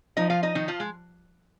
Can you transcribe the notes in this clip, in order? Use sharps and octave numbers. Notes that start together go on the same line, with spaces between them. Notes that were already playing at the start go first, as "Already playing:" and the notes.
F3 D#4 D#5
F4 F5
D#4 D#5
D#3 D#4
F3 F4
G#3